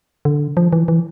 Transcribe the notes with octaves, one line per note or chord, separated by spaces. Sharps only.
D3
F3
E3
E3